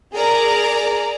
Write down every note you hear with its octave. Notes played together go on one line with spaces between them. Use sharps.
G#4 A#4 D5 A#5